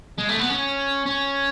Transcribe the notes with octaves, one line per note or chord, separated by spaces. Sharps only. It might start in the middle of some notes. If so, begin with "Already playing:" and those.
G#3
A3
B3
C#4
C#4